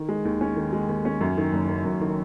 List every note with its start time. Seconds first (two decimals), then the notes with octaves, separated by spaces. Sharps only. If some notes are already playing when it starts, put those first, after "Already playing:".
Already playing: D#3
0.09 G#3
0.25 D#2
0.41 C#4
0.56 D#3
0.73 G#3
0.89 D#2
1.05 C#4
1.21 F#2
1.37 D#3
1.53 F#1
1.69 F#1
1.85 F#2
2.01 D#3